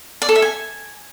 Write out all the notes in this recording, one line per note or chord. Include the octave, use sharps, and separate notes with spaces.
D5
A4
E5
G#5